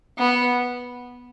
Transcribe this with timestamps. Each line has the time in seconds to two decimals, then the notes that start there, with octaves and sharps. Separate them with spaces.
0.18 B3